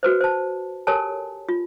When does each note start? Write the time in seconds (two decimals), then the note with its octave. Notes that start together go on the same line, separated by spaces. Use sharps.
0.03 F#4 B4 C5
0.21 C5 A5
0.87 G4 A4 A#4 C#5 G#5 A5
1.49 F4